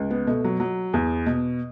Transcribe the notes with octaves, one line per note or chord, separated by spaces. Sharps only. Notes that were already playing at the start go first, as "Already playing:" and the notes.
Already playing: C#2
B3
B2 A3
F#3
F#3
E2
B2